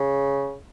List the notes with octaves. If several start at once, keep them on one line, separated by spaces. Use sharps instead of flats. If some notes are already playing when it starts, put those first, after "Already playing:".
Already playing: C#3